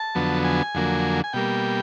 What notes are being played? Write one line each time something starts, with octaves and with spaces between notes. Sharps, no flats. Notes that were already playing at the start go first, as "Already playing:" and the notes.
Already playing: A5
F2 D3 F#3 B3
G#5
F2 D3 F#3 A#3
G#5
B2 G3 A#3 G5